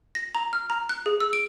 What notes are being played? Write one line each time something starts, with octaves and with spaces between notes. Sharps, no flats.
A#6
A#5
F6
A#5
F#6
G#4
E6
D7